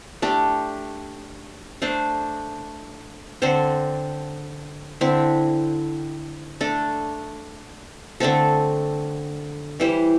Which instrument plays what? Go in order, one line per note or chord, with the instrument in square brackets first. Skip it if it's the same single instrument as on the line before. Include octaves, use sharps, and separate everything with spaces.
[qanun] A3 D4 G4
A3 D4 C5
D3 C4 A4 C5
D3 C4 E4
A3 D4 A4
D3 A3 C4 A4
E3 G3 E4 C5